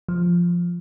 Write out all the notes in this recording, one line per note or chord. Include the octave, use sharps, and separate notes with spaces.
F3